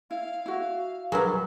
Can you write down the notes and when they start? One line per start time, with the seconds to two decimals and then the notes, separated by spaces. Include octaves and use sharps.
0.11 E4 F5
0.46 E4 F#4
1.12 F#3 G3 G#4 A#4 B4